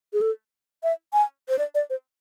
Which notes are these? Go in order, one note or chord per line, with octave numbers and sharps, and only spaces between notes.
G#4
A4
E5
G#5
C5
D5
D5
C5